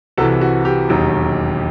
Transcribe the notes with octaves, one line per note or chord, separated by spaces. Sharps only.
C2 C3 E3 F#4 A4
F#4
G4
E1 D#2 D#3 F#3